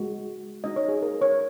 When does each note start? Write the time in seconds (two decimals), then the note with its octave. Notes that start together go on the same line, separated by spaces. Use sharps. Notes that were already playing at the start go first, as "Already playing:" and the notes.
Already playing: G#3 F#4
0.64 G#3 D#4 F#4 D#5
0.76 C#5
0.88 G#4
1.02 A#4
1.21 C#5